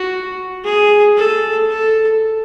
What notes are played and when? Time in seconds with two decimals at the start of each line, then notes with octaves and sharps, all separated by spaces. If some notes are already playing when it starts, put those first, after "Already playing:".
Already playing: F#4
0.64 G#4
1.17 A4
1.70 A4